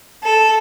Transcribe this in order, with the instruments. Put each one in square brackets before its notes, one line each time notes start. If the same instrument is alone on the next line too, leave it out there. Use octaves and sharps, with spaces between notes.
[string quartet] A4